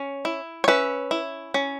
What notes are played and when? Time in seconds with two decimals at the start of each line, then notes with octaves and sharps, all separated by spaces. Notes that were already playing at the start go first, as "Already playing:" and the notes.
Already playing: C#4
0.25 E4
0.64 C#5
0.68 C#4 B4 E5
1.11 E4
1.54 C#4